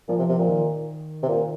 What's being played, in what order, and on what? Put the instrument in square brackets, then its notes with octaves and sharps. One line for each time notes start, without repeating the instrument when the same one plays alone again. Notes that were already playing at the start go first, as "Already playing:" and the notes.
[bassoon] A#2 [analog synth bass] F3
[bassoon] C3
C3
A#2
[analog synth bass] D#3
[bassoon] C3
A#2